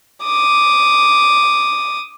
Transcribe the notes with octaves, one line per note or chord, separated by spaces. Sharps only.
D6 D#6